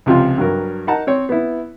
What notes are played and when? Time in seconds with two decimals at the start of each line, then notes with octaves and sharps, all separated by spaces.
0.06 C#2 C3 F3 F4
0.38 G2 F#3 A#4
0.87 D#4 A#4 F#5 A5 A#5
1.07 C4 C#5
1.29 B3 E4